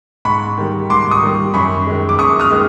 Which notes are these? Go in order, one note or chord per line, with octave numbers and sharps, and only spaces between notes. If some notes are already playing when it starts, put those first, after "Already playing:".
G#2 B5 C#6
D#3 G3
G#2 C6 D6
C#6 D#6
D#3 G3
F#2 B5 C#6
D#3 G#3
D6
F#2 C#6 D#6
D#6 F6
D#3 G#3